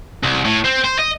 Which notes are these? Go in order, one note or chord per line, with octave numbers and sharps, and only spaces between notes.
C2
A2
C4
C5
D#5